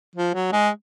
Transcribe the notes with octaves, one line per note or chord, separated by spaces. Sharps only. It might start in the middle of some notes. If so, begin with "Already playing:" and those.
F3
F#3
G#3